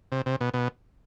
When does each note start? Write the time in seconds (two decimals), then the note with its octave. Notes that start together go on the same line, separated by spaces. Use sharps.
0.12 C3
0.26 C3
0.41 B2
0.54 B2